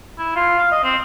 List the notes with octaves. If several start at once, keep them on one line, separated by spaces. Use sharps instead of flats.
E4
F4
F5
D#5
C4